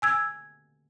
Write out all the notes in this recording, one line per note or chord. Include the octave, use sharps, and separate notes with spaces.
G#5 E6 G#6